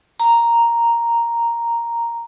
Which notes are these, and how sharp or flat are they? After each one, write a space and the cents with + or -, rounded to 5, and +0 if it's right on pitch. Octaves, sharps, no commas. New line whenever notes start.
A#5 +0